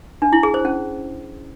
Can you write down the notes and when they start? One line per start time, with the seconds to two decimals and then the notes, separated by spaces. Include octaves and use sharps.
0.22 D4
0.33 E4
0.43 G#4
0.54 C5
0.65 C#4